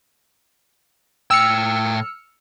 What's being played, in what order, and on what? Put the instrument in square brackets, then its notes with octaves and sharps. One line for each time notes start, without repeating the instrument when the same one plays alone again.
[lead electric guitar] A2 G5 [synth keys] E6 F6 C#7